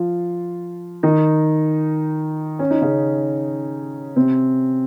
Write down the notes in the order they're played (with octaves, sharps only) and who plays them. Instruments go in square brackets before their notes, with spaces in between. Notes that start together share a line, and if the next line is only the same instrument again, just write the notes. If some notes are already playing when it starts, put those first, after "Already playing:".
Already playing: [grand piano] F3 F4
D#3 D#4
C#4
D#4
C#3 C#4
C3 C4